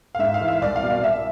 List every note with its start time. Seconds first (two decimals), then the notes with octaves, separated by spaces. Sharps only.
0.15 F5
0.19 G#2 E5
0.34 F5
0.41 E3
0.48 E5
0.62 C2 D5
0.76 F5
0.83 B2
0.90 D5
1.04 C2 E5